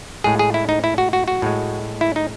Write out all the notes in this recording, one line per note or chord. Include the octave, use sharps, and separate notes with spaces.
A2 G#3 G#4
G#4
E4
D#4
E4
F#4
F#4
F#4
A2 G#3
E4
D#4